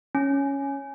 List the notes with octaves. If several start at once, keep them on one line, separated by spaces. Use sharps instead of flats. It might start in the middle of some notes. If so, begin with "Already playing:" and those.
C#4